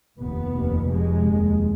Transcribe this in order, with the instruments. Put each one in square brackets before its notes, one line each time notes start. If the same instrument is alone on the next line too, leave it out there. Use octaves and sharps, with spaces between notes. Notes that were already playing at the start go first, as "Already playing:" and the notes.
[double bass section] F1 D#2 B3
F1 D#2
F1 F2 C3 G#3
F1 D#2